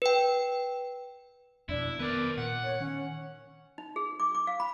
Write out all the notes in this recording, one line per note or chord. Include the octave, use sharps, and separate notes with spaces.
B4 G5
F2 B2 D4 E4
D#3 B3 A#4 B4 D5
A#2 F#5
C#5
D#3 C#4
D#4
G#4
D6
D6
F5
B5